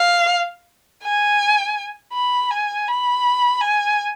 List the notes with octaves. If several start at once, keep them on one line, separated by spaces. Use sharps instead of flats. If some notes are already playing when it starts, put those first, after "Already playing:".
Already playing: F5
G#5
B5
G#5
B5
G#5